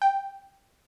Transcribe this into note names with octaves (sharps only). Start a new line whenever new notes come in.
G5